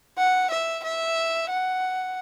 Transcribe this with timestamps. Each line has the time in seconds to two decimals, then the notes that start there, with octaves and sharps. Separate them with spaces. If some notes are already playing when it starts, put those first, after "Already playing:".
0.17 F#5
0.51 E5
0.83 E5
1.49 F#5